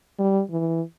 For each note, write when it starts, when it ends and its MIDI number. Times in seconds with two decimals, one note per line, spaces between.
0.19 0.41 55
0.51 0.81 52